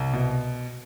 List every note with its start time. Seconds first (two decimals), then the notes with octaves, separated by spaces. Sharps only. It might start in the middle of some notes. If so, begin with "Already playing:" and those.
Already playing: C2
0.13 B2